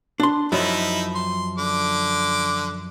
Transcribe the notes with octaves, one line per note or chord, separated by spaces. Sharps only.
D4 C6
F#2 F3 D#4 E4 B5
C6
D3 D6